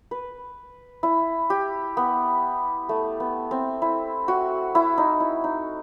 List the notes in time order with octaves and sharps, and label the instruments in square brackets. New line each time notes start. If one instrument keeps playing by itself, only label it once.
[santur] B4
E4
G4
B3
A3
B3
C4
E4
F#4
E4
D#4
E4
D#4